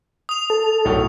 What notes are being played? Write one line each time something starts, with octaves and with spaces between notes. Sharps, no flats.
D#6 F7
A4
B1 A2 A3